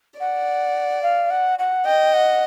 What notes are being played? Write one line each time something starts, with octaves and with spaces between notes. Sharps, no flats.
D5 F#5
F5
F#5
F#5
D#5 G5
F#5